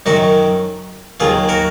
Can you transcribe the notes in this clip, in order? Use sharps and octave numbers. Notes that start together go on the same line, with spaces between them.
F#2 D#3 F#3 D#4 F#4
D#2 D#3 F#3 F4 G#4
F#4 A#4